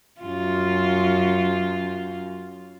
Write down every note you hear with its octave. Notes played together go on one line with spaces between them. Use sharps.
F#2 F4